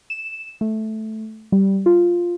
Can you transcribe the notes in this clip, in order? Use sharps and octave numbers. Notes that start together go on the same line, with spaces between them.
E7
A3
G3
F4